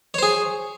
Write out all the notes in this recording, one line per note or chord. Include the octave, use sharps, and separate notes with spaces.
G#4 C5 C#5